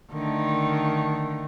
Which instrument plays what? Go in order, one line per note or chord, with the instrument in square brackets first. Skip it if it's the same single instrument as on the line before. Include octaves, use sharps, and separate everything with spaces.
[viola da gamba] D3 D#3 A3